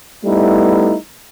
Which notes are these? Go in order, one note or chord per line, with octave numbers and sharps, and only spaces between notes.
G3 A3 B3 D#4 E4